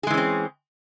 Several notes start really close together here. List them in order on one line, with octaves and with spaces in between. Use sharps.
G#4 G#3 E3 C#4 C4